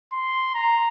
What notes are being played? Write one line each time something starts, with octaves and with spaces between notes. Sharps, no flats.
C6
A#5